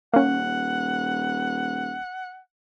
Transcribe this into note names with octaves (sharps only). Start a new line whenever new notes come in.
D#1 A#3 C#4 F#5